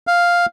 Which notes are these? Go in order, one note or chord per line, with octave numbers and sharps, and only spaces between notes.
F5